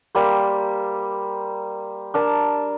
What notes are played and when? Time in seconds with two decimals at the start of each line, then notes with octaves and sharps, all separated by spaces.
0.15 G3 A#3 C5
2.14 D4 A#4 A5